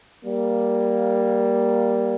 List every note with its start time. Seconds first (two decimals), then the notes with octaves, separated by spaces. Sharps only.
0.24 G3 A#3